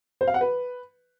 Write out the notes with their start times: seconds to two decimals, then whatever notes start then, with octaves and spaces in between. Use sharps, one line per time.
0.21 C5
0.27 F5
0.34 F#5
0.41 B4